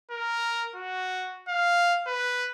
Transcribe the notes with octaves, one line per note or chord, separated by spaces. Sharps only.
A#4
F#4
F5
B4